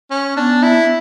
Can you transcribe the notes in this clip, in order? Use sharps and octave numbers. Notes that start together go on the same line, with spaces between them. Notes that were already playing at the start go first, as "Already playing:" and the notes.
C#4
B3 D4
E4